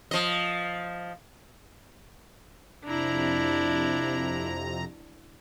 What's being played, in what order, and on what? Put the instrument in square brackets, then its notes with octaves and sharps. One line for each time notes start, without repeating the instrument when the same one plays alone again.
[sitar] F3 D#5
[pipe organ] F2 C3 A#5 [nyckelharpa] D4 E4